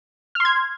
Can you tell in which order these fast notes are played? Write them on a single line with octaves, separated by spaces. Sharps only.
F6 C6 G#6